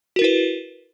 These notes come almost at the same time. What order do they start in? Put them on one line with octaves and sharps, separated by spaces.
F#4 A#4 E4 B4